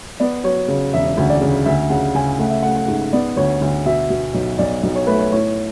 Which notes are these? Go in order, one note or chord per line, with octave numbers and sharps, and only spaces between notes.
B3 D5
F#3 C#5
C#3
E1 E5
D2
D5
C#3
D2 E5
C#3 F#5
C#3 G#5
A3 F#5
E5
A3 F#5
F#5
G#2
B3 D5
D2 C#5
D2
B2 E5
B2
B1
B1 D5
B1
C#5
A3 B4
C#5
A2 C#5